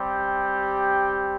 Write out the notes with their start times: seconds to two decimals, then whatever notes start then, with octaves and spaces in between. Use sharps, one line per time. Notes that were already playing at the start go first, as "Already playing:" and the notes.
Already playing: G3 C4 G4
0.25 G5